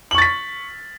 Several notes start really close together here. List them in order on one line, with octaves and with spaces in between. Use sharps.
F#7 C#6 A6 B6